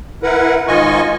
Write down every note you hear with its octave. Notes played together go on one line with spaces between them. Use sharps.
E4 A#4 B4 F#5
G#2 D#3 F4 D#5 G#5 C#6